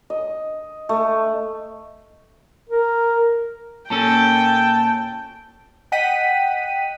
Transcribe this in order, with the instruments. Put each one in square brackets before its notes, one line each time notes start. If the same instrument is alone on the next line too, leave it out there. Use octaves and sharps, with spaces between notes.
[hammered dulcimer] D#5
A3
[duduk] A#4
[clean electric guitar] A#2 C#4 A4 [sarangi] G5 [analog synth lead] A5
[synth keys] D#5 F#5 G5 B6 D#7